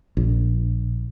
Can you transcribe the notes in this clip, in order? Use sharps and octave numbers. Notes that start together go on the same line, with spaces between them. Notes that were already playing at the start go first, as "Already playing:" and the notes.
A#1